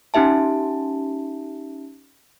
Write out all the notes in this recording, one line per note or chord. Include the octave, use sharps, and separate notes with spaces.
C#4 D#4 G4 E5 A5